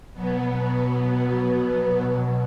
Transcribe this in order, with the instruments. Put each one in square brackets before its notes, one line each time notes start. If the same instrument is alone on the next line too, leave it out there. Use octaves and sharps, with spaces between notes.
[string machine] B2 F#3 B3